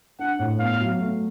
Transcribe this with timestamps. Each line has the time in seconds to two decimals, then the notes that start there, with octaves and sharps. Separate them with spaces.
0.19 D4 F#5
0.39 A2
0.60 B3 F5
0.80 F#3
1.00 A3